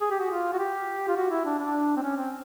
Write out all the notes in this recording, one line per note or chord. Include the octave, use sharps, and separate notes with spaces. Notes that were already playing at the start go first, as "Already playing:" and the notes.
G#4
G4
F#4
F4
F#4
G4
F4
F#4
E4
D4
D4
C4
C#4
C4